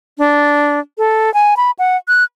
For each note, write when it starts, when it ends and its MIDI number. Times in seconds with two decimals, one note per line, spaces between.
0.18 0.80 62
0.98 1.33 69
1.34 1.54 80
1.57 1.71 83
1.79 1.97 78
2.08 2.24 90